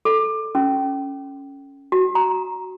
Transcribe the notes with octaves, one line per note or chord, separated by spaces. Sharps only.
A4
C#4
F#4
A#5